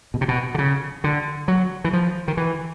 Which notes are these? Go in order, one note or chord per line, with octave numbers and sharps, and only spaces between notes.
B2
C3
B2
D3
C#3
D3
F#3
E3
F3
D#3
E3